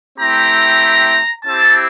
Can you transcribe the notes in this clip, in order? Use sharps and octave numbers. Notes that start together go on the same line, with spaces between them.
A3 C4 E4 G4 A#5
C4 E4 G4 A5